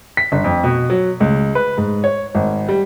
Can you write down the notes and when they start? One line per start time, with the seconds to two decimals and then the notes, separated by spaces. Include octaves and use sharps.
0.17 B6
0.32 G1
0.44 F2
0.64 B2
0.90 F#3
1.20 C#2
1.55 B4
1.78 G#2
2.04 C#5
2.35 G#1
2.69 G3